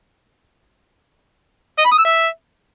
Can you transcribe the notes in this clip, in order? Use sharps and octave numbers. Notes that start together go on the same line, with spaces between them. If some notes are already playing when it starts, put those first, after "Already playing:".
D#5
B5
D#6
E6
E5